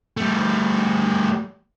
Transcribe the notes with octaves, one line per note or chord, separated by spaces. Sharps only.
G3 A3